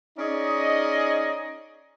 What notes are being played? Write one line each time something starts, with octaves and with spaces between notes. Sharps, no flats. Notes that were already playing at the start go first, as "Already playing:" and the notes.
C#4 D#4 G#4 D5 D#5